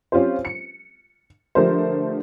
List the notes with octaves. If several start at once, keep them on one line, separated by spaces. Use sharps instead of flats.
C4 C#4 F4 G4 C5
C#7
D3 F3 A3 G4 A#4 C5